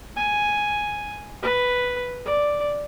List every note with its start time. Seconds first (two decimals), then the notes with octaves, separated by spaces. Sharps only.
0.16 G#5
1.42 B4
2.25 D5